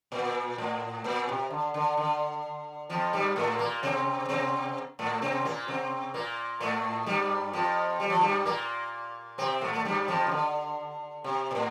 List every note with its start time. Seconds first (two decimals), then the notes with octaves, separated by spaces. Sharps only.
0.12 A#2
0.58 A2
1.04 A#2
1.27 C3
1.50 D3
1.74 D3
1.97 D3
2.90 F2 F3
3.13 G2 G3
3.36 A2 A3
3.59 A#2 A#3
3.83 C3 C4
4.29 C3 C4
4.99 A2 A3
5.22 C3 C4
5.45 A#2 A#3
5.68 C3 C4
6.14 A#2 A#3
6.60 A2 A3
7.06 G2 G3
7.53 F2 F3
8.00 G3
8.10 F3
8.21 G2 G3
8.46 A#2 A#3
9.38 C3 C4
9.61 A2 A3
9.74 A3
9.85 G2 G3
10.08 F2 F3
10.27 C3
10.32 D3
11.24 C3
11.51 A#2
11.55 A2